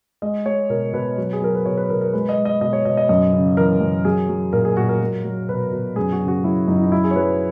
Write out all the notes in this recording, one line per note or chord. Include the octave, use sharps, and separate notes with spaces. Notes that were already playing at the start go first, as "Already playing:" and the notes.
G#3 D#5
G#3 C#5
B2 A#4
B2 B4
F#3
G#4
F#3 A#4
B4
B2 C#5
B4
B2 A#4
A#4
G#3 B4
D#5
G#3
D#5
B2 D#5
C#5
B2 D#5
D#5
F#2 D#5
C#3
E3 A#4
F#2
F#3 G#4
F#3
A#2 A#4
G#4
A#2 F#4
A#4
F#3
F#3
B2 B4
B2
F#2 G#4
F#4
C#3
F#4
F#3 E4
F#2 D#4
E4
D#4
F#3 E4
G#4
C#5
F#3 B4